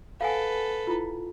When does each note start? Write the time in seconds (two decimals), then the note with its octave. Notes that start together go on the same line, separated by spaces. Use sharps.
0.21 A4 B4 F5 F#5 G#5
0.87 E4 F4